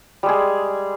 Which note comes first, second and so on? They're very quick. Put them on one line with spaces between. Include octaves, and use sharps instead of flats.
G3 G#3 G#4